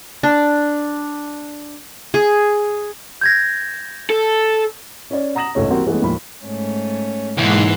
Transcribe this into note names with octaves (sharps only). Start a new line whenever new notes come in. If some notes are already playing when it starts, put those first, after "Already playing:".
D4
G#4
G6 G#6 A#6
A4
C#4 D5
F#5 A#5 D#6 A#6 E7 F#7
G#1 C#2 A3 C#5
E3 G3 A#3 C4 F#4
E3 G#3 A3 B3 C#4
D#2 A2 F3 B5
G#2 A3 C#4
B1 G#2 E3 A#3 F#5 C6